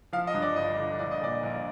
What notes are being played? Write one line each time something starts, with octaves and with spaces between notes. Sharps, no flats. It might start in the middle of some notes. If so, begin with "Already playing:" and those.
F3 F5
D#5
G2
D5
G1 D#5
D3
A#1 D5
D#5
A#2 D5
A#1